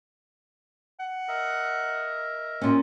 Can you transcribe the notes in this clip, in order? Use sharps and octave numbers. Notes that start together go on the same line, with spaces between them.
F#5
A#4 D#5 E5
A#2 C#4